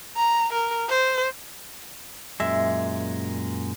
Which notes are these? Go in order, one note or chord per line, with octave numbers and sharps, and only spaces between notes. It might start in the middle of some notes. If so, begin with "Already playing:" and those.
A#5
A#4
C5
F#2 A#2 G#3 E5